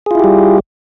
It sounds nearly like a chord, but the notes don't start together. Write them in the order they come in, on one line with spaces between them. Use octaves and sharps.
G#4 F4 E4 G4 G3